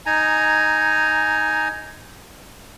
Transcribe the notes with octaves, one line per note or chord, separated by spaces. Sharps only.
D#4 G#5 A#5